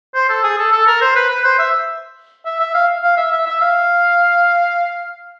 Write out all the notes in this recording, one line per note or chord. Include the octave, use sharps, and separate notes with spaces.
C5
A4
G#4
A4
A4
A#4
C5
B4
B4
C5
E5
E5
E5
F5
F5
E5
E5
E5
F5